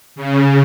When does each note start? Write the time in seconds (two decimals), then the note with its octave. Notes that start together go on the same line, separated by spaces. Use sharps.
0.16 C#3